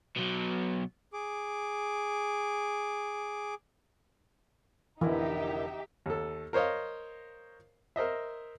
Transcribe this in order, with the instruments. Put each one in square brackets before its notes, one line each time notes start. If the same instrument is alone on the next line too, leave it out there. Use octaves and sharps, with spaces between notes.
[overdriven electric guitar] B2 F#3
[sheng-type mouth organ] G#4 D6
[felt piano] F1 D3 E4 [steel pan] E3 [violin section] D#4 G4 E5 [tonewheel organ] A#4
[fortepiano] D#2 A4
A#4 C5 C#5 D#5 F5
A#4 C5 D#5 E5